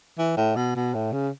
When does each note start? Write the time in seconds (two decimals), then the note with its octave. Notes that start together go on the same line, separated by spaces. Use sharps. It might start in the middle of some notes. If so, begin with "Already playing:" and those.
0.19 E3
0.37 A2
0.56 B2
0.76 B2
0.94 A2
1.13 C#3